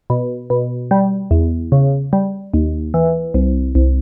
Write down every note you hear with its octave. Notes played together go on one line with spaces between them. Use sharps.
B2
B2
G3
E2
C#3
G3
D#2
E3
C2
C2